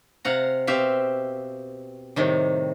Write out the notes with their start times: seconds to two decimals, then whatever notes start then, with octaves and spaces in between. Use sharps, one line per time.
0.25 C3 F5 F#5 A#5
0.67 B2 C4 G4 E5 F5
2.16 A2 C3 D#3 G3